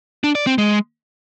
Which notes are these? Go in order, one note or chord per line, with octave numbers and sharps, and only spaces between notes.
D4
D5
C4
G#3